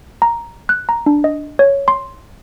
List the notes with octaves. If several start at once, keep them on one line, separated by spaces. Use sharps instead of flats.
A#5
F#6
A#5
D4
D#5
C#5
C6